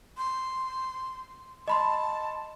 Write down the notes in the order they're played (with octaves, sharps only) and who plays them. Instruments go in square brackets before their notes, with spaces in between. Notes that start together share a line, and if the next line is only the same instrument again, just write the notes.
[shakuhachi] C6
[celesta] D#5 B5 C6 [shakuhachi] A5